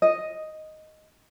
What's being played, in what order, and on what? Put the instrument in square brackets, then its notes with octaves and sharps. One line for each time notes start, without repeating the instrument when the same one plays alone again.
[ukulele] D#5